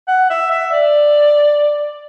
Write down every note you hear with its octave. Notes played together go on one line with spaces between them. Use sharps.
F#5
E5
E5
D5